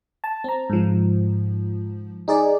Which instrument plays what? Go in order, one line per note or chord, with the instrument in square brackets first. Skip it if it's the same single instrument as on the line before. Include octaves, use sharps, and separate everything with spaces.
[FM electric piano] A5
C4 A#5
G#2 F3
D#4 G#4 D5